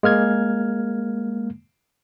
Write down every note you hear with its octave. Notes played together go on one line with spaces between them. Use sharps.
G#3 A#3 F6 G#6